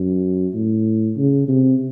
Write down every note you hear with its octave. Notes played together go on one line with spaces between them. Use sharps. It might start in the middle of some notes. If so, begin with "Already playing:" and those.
Already playing: F#2
A2
C#3
C3